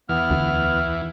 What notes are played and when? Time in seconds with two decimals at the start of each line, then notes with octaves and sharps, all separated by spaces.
0.09 E2 E3 B3 F6
0.30 D2